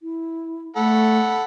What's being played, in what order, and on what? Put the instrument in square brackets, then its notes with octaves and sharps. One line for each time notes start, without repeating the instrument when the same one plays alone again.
[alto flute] E4
[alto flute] A3 [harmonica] A4 F#5 B5